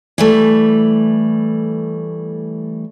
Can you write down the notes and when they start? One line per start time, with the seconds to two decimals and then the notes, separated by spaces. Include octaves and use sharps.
0.18 E3 G3 A3